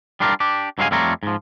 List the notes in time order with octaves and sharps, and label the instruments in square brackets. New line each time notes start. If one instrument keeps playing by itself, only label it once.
[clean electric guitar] G3 D4 F4 G4 A#4
D4 G4
G2 F#3 G#3 E4 F5 G#5
F2 G3 A3 F4 C#5 A#5
G#2 F3